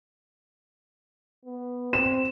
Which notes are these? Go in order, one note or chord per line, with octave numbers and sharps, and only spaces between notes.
B3
C4 E7